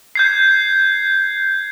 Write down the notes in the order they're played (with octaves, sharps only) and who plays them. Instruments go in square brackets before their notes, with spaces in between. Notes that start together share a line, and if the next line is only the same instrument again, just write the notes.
[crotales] G6 G#6 C7